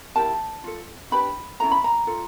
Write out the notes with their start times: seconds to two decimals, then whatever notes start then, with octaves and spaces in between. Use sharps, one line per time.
0.15 E4 G4 A#4 A5
0.64 F4 A4
1.11 D4 G4 B4 B5
1.60 C#4 E4 A4 A#5
1.71 B5
1.84 A#5
2.07 F4 A4